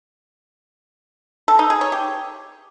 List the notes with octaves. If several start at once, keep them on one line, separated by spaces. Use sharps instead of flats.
A4
D#4
G#4
C#5
G4